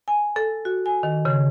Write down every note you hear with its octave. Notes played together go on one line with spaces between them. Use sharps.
G#5
A4
F#4
G#5
D#3
C#3